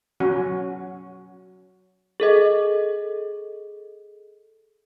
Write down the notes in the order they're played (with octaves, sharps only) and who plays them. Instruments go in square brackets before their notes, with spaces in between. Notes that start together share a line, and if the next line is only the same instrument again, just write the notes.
[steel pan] F#3 C#4 F#4
[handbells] G#4 A4 D#5